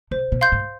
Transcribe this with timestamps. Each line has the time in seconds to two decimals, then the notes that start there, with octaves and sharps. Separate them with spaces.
0.11 C3 C5
0.32 B2
0.41 F5 C6 G6
0.52 G#2